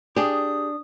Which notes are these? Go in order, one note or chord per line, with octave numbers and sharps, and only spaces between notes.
D4 G4 G#4 D#6